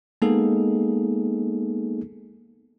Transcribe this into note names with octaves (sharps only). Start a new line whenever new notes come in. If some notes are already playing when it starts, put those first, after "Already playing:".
G#3 A#3 B3 D#4 G#4 A4